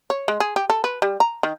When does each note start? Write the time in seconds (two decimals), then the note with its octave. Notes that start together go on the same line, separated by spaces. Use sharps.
0.10 C#5
0.28 G#3
0.40 G#4
0.56 G4
0.70 A4
0.84 B4
1.02 G3
1.20 A#5
1.43 D#3